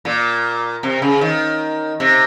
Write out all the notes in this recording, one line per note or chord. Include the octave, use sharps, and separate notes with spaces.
A#2
C3
C#3
D#3
C3